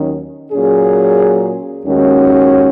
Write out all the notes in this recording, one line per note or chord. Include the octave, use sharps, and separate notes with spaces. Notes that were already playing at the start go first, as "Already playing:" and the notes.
Already playing: D#2 D#3 F#3 C#4
A#2 F#3 C#4 G#4
D#2 D#3 G#3 C#4 F#4